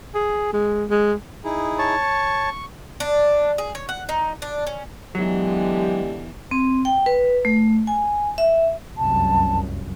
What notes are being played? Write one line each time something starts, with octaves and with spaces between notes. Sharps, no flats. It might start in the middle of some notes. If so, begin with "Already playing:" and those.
G#4
G#3
G#3
D#4 E4 G#4
C#5 A5
C#6
D4
G#4
C#5
F#5
D#4
D4
C#4
D3 E3 F#3 G#3 B3 G4
C4
G5
B4
A3
G#5
E5
F1 C2 F#2 A5